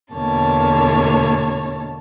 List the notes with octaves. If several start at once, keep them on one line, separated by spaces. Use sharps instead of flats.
E2 B2 D3 A#3 C#5 A5